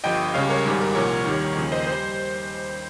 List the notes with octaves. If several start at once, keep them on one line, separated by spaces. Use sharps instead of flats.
G1 G2 F3 D#5 G5
C#2 C#3 G3 C#5 F5
A#4 C#5
G#1 G#2 G3
A#4
C2 A#2 F3 A#4 C#5
D#2 D#3 G3
D#2 C#3 F3
C5 D#5
G3 C5